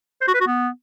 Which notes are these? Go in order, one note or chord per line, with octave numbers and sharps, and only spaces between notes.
C5
F#4
B4
F#4
B3